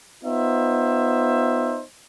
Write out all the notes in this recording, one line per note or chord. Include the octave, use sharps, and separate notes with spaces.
B3 D#4 F4 C5 E5